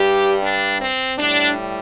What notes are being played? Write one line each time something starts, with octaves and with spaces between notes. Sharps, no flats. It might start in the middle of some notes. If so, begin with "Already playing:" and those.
Already playing: G2 G3 G4
D4
C4
A2 G3 D4